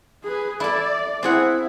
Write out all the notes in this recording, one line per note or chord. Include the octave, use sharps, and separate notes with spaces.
G#4 B4
E4 A4 D5
C4 E4 G#4 F#5